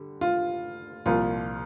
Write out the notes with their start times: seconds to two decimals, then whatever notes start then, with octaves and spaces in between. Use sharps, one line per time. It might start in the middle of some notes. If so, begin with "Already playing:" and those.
Already playing: D3 G3
0.21 F4
1.05 C2 A#2 F3 F4